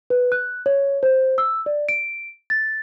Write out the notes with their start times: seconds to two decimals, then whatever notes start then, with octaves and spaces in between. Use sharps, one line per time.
0.10 B4
0.32 F#6
0.66 C#5
1.03 C5
1.38 E6
1.66 D5
1.89 D7
2.50 A6